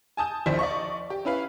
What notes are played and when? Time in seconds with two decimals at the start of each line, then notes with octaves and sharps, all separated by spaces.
0.17 G#5 A5 D#6 G6
0.46 A#1 D#2 D4 E4 C5 B6
0.59 D5 D#5 C#6
1.10 G4
1.25 C#4 E4 B4 F5